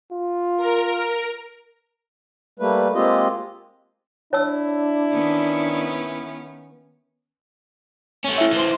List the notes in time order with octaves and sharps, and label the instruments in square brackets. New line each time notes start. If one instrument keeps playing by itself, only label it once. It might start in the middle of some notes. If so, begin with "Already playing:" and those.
[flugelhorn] F4
[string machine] A#4
[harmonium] G3 A3 A#3 B4
G#3 A#3 C4 F4 G4 D#5
[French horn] D4 [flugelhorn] E4 [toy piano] C#5 A5 E6
[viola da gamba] D#3 B3 C#4
[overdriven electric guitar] A3 C#4
[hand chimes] E4 E5
[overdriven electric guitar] E3 C5